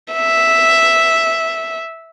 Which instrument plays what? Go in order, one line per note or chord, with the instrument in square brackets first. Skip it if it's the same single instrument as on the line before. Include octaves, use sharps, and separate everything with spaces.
[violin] E5